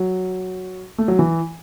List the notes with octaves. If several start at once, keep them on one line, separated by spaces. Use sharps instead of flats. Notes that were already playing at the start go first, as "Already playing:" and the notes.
Already playing: F#3
A3
F#3
E3